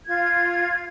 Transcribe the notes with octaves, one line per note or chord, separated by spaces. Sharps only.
F4 G#6